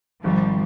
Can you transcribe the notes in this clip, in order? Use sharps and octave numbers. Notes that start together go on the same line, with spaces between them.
G#1 F3 G3